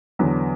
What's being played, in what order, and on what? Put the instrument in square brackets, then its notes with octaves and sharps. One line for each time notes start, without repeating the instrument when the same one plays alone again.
[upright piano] E2 D3 F#3 B3